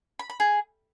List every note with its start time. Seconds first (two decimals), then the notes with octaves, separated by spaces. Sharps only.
0.19 B5
0.30 B5
0.40 G#4